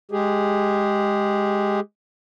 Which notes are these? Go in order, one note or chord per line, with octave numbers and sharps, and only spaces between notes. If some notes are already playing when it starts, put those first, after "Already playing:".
G#3 G4 G#4